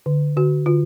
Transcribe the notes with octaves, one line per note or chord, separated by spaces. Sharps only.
D3
D3 F#4
D3 F4